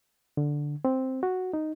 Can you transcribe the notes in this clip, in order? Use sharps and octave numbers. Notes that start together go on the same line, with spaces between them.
D3
C4
F#4
D#4